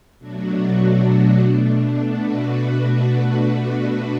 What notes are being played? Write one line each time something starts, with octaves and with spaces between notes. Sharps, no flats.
B2 F#3 A3 D4 F#4
D4
B2 A3
F#4 B4